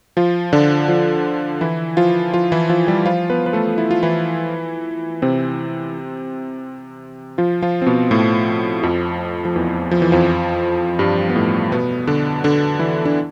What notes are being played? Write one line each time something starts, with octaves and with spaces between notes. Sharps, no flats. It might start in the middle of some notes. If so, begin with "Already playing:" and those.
F3 F4
D3 D4
F3 F4
E3 E4
F3 F4
F3 F4
E3 E4
F3 F4
G3 G4
F3 F4
B3 B4
B4
A3 A4
E4
F4
E3 E4
C3 C4
F3 F4
F3 F4
C4
B2 B3
A2 A3
F2 F3
F3
E2 E3
F3
E3
F2 F3
G2 G3
B3
A2 A3
B2 B3
D3 D4
D3 D4
E3 E4
D4